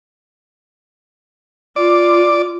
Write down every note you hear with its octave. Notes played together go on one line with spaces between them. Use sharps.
F4 D5